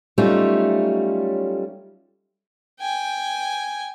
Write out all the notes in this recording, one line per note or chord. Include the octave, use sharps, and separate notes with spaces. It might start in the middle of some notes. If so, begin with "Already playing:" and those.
F#3 G3 A3 C#4 D#4 F4
G5 G#5